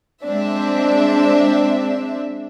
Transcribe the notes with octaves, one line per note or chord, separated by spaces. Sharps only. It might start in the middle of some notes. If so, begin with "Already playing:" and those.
G#3 C4 D4 E5